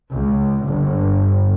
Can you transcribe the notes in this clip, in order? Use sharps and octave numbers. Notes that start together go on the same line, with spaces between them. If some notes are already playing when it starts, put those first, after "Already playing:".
C#2
G1